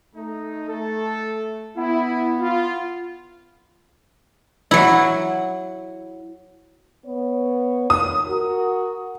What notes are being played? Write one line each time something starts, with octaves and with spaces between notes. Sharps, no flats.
A3 D#4
A3 A4
B3 E4
F4
F#3 E4
B3 C#5
D#2 D#6
F#4 A#4